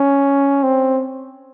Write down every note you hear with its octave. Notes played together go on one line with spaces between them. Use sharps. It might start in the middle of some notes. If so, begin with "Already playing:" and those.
Already playing: C#4
C4